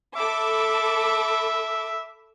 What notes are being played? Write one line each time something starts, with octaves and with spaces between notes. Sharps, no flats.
A4 E5 B5 D6